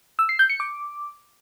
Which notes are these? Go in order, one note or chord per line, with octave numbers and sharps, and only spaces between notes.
E6
C7
G6
C#7
D6